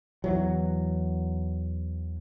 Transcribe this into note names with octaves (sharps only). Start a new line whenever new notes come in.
E2 E3 F#3